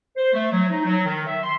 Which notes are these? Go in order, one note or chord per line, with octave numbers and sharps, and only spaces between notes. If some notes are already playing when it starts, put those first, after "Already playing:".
C5
A3
F#3
D#4
F#3
D#3
E5
C6